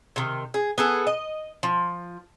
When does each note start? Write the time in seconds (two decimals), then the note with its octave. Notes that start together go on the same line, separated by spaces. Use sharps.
0.16 C3 D#3
0.54 G#4
0.78 B3 G#4 A4
1.07 D#5
1.63 F3